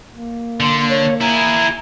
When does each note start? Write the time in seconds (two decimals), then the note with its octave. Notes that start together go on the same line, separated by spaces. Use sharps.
0.12 A#3
0.60 D3 C6
0.89 C#5
1.21 E4 G#4 A#5